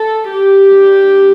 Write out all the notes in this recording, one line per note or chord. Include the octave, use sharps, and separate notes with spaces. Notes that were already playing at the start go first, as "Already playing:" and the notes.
Already playing: A4
G4
G3 D4